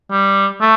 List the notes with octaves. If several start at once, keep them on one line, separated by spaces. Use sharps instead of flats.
G3
A3